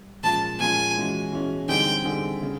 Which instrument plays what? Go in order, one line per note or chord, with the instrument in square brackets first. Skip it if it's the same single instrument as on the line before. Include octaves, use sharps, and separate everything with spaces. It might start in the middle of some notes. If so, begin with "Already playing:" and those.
Already playing: [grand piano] G3
[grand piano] A#2 F3 G#3 C#4 F4 [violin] A5
[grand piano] A#2 F3 G#3 C#4 F4 [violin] G#5
[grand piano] E3 G#3 C#4 F#4
E3 G#3 C#4 F#4
[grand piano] D3 G3 C4 D#4 G#4 [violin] G5
[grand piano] D3 G3 C4 D#4 G#4
C#3